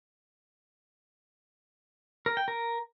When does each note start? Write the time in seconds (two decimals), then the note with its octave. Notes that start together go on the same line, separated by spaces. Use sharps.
2.26 A#4
2.37 G5
2.48 A#4